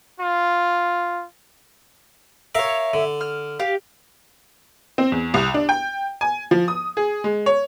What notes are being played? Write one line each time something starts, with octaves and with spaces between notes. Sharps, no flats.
F4
A#4 C#5 E5 F5
D3
F6
G4 F5
C4
E2
C2
D4
G5
G#5
F3
D#6
G#4
G#3
C#5